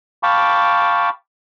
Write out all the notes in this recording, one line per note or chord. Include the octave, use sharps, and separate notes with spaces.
F5 G5 A5 B5 C#6 D6